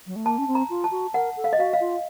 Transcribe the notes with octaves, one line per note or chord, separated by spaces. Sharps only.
F#3
A3
A#3 A5
C#4
C4
A#5
F4
A5
F#4
A#4 F#5
A4
F5
D#5
F#4 F5
F5
F4